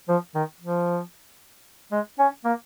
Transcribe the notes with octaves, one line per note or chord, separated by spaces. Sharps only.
F3
D#3
F3
G#3
C#4
A#3